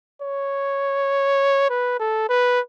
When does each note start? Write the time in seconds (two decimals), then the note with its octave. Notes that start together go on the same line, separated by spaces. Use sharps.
0.22 C#5
1.70 B4
2.00 A4
2.30 B4